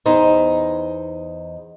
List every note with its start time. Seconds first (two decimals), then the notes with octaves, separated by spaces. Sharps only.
0.06 E2 D#4 C5